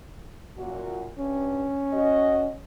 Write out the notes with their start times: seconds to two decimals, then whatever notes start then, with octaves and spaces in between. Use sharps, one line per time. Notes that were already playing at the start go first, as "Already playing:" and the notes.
0.58 F#2 A#2 F#4
1.19 G2 C#4
1.92 F#4 D#5